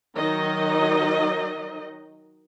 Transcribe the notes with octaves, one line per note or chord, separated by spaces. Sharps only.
D#3 F#3 D#4 D#5